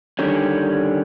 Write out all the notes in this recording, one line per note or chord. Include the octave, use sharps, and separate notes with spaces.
D3 D#3 G3 C#4